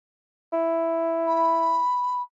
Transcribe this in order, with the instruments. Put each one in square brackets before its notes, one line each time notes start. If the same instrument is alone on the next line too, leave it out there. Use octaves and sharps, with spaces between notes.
[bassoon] E4
[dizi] B5